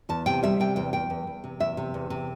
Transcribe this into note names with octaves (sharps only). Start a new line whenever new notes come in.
E2 A5
C3 G5
G3 E5
C3 G5
E2 G5
E2 G5
E2
E2
C3
E2 E5
C3
E2
C3